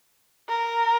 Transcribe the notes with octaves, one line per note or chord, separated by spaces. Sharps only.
A#4